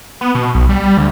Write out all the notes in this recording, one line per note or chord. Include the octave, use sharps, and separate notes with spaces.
B3
B2
B1
G3
D2